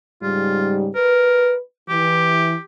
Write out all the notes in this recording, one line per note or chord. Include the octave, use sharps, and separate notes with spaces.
G#2 C#3 G3 F4
A#4 B4
E3 G4